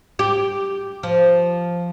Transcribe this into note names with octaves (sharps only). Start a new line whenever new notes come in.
G4
F3